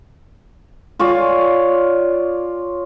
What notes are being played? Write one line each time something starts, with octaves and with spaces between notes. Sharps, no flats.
F4 C#5 D5 G#5